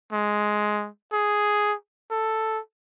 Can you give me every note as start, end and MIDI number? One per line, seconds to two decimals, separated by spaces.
0.13 0.88 56
1.13 1.74 68
2.11 2.59 69